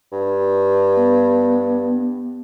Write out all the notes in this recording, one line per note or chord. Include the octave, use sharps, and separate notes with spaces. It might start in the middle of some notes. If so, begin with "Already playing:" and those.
G2
B3